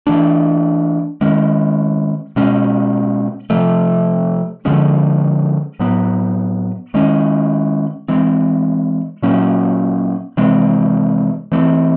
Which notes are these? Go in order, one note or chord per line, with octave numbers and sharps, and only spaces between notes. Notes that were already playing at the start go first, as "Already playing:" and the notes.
E3 A3 D4
D#3 G#3 C#4
B2 G#3 C#4
C3 F3 A3
D3 F3 G#3 C#4
A2 F#3 B3
D#3 G#3 C#4
E3 G#3 C4
A#2 F#3 A#3 C#4
C3 E3 G#3 C4
E3 A3 C4